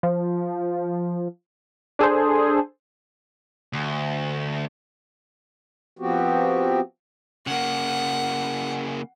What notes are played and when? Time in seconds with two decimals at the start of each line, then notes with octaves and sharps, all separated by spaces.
0.03 F3
1.99 D4 G#4 A4 C5
3.73 D2
5.99 F3 B3 C4 F#4 G4
7.47 C#3 A#3 F#5